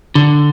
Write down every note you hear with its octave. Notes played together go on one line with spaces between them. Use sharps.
D3